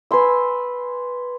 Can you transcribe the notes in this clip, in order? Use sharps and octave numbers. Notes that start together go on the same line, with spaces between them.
B4 G#5 C6 E6